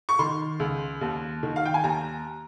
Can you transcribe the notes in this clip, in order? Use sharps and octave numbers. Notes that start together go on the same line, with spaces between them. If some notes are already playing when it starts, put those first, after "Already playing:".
C#6
D#3 C6
C#2
D#2
D#3
F5
G5
G#5
D#2 A#5